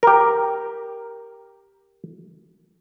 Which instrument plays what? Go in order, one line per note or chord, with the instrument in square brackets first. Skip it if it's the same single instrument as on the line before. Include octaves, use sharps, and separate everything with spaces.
[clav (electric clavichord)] G4 A#4